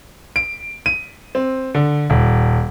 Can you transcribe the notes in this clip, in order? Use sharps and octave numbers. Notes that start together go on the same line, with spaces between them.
D7
D#7
C4
D3
D#1